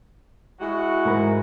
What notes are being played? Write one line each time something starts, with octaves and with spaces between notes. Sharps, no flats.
G#3 E4 F#4
G#2 A#4 B5